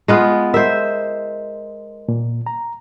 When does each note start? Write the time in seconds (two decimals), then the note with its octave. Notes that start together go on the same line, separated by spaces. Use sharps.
0.08 G#3 B3 F4
0.54 A#4 C5 D#5 E5
2.09 A#2
2.46 A#5